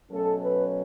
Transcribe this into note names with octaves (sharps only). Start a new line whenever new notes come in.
B2 F#3 A3 C#4 A4
B4